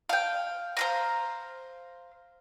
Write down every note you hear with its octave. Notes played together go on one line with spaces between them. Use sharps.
F5 G5
C5 F5 A#5